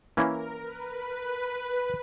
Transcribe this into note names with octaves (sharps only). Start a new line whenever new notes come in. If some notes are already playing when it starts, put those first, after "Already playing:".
E3 A#3 C#4 E4 A#4
B4